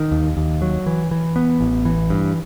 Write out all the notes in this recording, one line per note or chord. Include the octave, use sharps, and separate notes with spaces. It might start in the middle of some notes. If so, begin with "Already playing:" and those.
Already playing: D#3
D#2
D#2
F#3
E3
E3
B3
A1
E3
G2